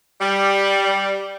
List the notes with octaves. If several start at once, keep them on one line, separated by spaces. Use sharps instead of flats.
G3